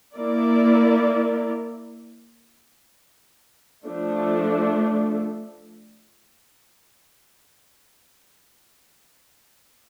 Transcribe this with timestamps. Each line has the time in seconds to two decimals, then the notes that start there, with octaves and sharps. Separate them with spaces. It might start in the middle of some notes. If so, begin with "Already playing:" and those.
0.14 A#3 E4 A#4 D5
3.86 F3 A3 D4